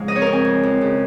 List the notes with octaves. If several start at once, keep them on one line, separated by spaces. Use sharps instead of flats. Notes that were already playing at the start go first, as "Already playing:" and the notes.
Already playing: G#2 C#3 F3 G#3 F4
F2 D#5
C#5
F2 A#4
G#5
F2
F2
C#3